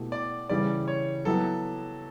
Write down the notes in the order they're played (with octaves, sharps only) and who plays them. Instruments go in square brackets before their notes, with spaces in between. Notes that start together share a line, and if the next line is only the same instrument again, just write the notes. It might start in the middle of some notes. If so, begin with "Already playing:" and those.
Already playing: [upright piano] B2 A3 E4 G4
[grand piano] D5
[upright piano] C#3 E3 G3 [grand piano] D5
[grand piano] C#5
[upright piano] F#3 B3 E4 G4 [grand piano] A4